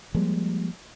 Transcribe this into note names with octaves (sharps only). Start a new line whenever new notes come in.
F3 G3 G#3 A#3